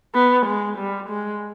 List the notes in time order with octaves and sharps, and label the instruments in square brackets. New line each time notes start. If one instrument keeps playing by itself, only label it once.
[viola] B3
G#3
G3
G#3